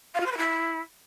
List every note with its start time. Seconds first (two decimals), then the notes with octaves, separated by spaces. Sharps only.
0.14 F5
0.20 F4
0.26 C5
0.32 B4
0.37 E4